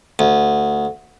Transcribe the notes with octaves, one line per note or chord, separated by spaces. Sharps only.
D2